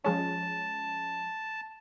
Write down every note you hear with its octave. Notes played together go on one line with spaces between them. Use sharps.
F3 G#3 C#4 A5